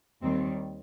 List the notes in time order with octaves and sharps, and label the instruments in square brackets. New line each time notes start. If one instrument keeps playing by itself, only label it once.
[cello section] D#2 D#3 G3 C4